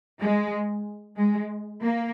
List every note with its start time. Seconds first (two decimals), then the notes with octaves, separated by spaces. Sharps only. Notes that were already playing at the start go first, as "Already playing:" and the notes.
0.19 G#3
1.17 G#3
1.82 A#3